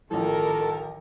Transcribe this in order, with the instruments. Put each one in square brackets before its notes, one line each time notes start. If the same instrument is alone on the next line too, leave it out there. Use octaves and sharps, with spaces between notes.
[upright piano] A1 F3 [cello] D#3 A#4 [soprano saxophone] A4